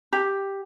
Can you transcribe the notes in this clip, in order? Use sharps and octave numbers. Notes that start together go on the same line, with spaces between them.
G4